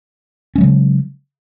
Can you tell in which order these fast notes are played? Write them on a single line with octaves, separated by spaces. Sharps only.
C#4 G#3 F#3 C#3